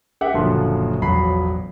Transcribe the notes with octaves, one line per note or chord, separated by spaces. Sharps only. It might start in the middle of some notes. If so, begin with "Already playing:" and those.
G4 E5 F#5
F#1 A#2 D3 F3 F#4 C6
E1 A1 F3 F#3 B5 C7